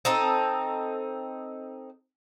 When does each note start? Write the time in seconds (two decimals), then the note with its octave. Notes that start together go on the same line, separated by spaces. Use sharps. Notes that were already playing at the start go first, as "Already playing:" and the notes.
0.05 C4 D#4 A4